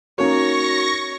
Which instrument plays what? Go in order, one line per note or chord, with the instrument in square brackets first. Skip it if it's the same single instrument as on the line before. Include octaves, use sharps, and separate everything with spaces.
[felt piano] A#3 C#4 D#4 [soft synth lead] F#4 [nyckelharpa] C#5 [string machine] C#6 A#6